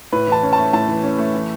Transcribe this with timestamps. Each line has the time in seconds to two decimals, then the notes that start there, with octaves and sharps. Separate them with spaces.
0.13 A2 B4
0.27 E3 A5
0.43 C#4
0.53 A5
0.58 A3
0.73 A2 A5
0.88 E3
1.03 C#4
1.19 A3
1.34 E3